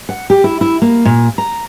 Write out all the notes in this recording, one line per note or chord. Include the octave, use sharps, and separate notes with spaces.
F#5
G4
E4
E4
A#3
A#2
A#5